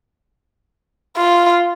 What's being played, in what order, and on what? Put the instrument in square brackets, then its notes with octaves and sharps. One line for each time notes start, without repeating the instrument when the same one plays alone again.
[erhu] F4